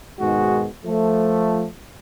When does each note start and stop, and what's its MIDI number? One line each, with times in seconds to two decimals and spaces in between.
0.20 0.66 44
0.20 0.66 47
0.20 0.66 51
0.20 0.66 56
0.20 0.66 66
0.85 1.65 53
0.85 1.65 57